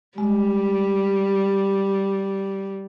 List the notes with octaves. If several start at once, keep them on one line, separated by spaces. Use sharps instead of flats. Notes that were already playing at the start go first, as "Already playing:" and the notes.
G3 G#3